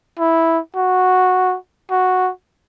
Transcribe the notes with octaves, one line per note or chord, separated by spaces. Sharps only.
E4
F#4
F#4